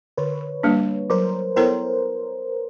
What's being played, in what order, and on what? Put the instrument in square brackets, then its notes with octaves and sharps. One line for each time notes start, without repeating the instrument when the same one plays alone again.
[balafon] D3 [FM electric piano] B4 C#5
[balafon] G3 A#3 D4
[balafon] F#3 [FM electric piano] A#4 C5
[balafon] B3 E4 A4 C#5 [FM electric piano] A#4 C5